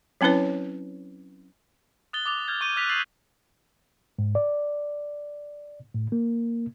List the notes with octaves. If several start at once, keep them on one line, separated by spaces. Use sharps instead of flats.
F#3 C4 C#4 E4 B4 C#5
D#6 F#6 A6 G7
D6 D#6 A6 F7 G7
F6 G6 G#6
C#6 G6 D#7
E6 F#6 G#6 B6 F7
E6 A6 C7 F#7
G#2
D5
A2
A#3